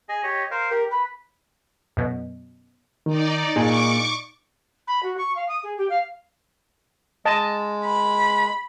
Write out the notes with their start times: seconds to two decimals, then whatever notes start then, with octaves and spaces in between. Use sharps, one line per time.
0.09 G#4 D#5 G#5
0.24 G4 C#5 D#5
0.51 A#4 C5 F5
0.71 G4 A#4
0.91 B4 B5
1.97 F#2 B2
3.06 D#3 D#4 D5
3.56 A#2 D4 G#4 D#5 C#6 D6
4.87 B5
5.03 F#4
5.18 C#6
5.36 F5
5.48 D#6
5.63 G#4
5.78 G4
5.90 F5
7.25 G#3 D#5 A5
7.84 B5